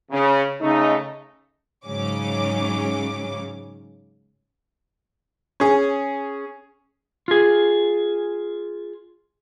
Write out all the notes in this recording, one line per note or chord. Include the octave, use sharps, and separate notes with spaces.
C#3
C#3 A3 D#4
G#2 C#3 F#3 C#4 D6
C#4 G#4
F4 G#4